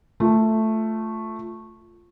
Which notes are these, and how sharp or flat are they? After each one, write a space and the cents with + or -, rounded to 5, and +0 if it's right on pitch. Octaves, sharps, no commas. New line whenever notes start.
A3 +0 F4 +0